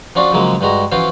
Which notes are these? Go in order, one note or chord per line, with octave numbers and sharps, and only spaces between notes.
F3 C#4 D4 F4 F#4
C#3 F3 F#3 G#3 A#3
G2 G#3 F#4 A#5
E3 F3 C#4 F4 F#4 C5